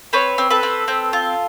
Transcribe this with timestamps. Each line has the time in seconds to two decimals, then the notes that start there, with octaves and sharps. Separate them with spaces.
0.13 C4 B4 C#5
0.38 C4
0.50 A4 B4
0.63 C4
0.88 C4
1.13 F4